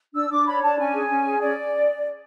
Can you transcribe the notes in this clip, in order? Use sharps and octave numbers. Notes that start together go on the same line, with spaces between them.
D4 E6
D4 D6
C#5 B5
D4 A5
C#4 G#5
G#4
C#4
G#4
C#4 D5